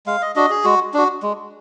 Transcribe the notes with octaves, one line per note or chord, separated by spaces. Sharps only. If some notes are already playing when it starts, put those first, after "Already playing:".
G#3 F5
D#5
D4 F#4 D#5
G#4
G#3 F#4
D4 F#4
G#3